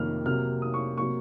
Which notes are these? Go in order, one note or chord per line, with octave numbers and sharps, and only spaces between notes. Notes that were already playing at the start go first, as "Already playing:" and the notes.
Already playing: F2 C3 D#3 A#3 F6
C3 F#3 A#3 F6
D#6
C#6
C3 F#3 A#3 C#6